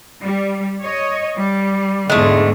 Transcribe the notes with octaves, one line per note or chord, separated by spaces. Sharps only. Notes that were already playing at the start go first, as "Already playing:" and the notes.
G3
C#5 D#5
G3
E2 G#2 D3 G#3 A3